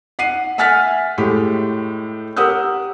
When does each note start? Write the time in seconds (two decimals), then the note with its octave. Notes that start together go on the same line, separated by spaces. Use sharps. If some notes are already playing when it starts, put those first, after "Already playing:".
0.19 F#5 C7 D#7
0.58 E5 F#5 G#5 F6 A6 B6
1.18 A2 G#3 G4
2.36 G4 A#4 F#5 D#6 E6 G6